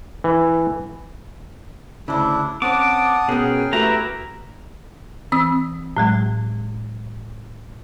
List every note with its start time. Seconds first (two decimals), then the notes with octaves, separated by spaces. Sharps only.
0.24 E3
2.08 D2 C#3 D4 E4
2.62 C4 C#4 F#5 A5 D6 D#6
3.28 B2 B3 C#4 G#4 A#4 G5
3.73 A3 E4 F#4 G4 B4 A#5
5.32 E3 C4 D#6 E6
5.97 A2 F#3 G#3